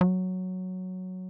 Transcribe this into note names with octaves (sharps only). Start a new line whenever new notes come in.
F#3